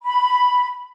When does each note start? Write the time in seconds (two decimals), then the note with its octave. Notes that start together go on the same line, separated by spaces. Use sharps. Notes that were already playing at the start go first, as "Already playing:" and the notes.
0.02 B5